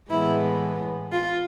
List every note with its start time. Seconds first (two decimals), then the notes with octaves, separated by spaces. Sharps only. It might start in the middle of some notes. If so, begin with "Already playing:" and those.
0.11 A2 E3 G#3 B3 E4
1.12 F4